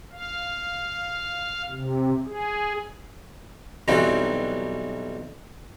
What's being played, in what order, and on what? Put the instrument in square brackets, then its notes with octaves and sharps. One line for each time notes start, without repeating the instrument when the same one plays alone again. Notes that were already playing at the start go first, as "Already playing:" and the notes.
[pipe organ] F5
C3
G#4
[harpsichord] B1 E3 F#3 G3 C4 D#4